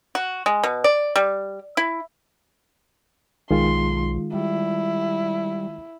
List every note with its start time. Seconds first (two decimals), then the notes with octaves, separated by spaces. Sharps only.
0.15 F#4
0.46 G#3
0.64 B2
0.84 D5
1.16 G3
1.77 E4
3.51 B1 D#3 G#3 F4 C6
4.34 G3 E4